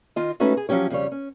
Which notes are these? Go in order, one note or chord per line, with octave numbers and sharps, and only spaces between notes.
D#3 F4 D#5
G#3 A3 C#4 D#4 F#4 B4
G#4
F3 F#3 C#4 G4 C#5
F2 C#3 G3 C#5
C#4